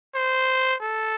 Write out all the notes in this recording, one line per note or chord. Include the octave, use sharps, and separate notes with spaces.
C5
A4